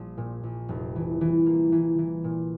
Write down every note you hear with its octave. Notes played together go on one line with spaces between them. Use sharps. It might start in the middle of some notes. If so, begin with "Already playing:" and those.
Already playing: A#1 F3
A#2
A#1
F1
E3
E3
A#3
E3
E3
A#2